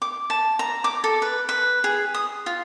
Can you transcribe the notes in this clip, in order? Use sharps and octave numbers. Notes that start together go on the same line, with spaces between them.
D6
A5
A#5
D6
A4
B4
B4
G#4
D#6
F4